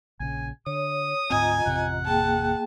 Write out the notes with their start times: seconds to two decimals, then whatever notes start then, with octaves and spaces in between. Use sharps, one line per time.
0.20 A#1 C#3 G#5
0.66 D3 C#5 D#6
1.30 D2 G#2 C4 F4 D#5 G#5 A#5
1.66 A1 F2 C3 F#5
2.06 A#3 G#4 G5 A5